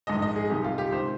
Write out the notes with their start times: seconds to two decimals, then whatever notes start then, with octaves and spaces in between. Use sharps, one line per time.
0.07 A#1 G#2 D#3 D#5
0.22 D#5
0.36 G#4
0.50 C2 C3 D#3 G4
0.64 F4
0.78 G4
0.92 C#2 C3 D#3 C5